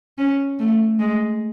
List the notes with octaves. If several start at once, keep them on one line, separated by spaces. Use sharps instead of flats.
C#4
A3
G#3